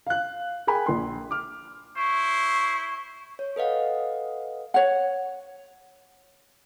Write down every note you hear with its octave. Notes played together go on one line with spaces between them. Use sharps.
F5 F#6
G#4 A#4 G5 G#5 B5
A#1 C6
D6 F6
E4 C5 C#6
C#5
A4 B4 D#5 F5 F#5
C#5 F#5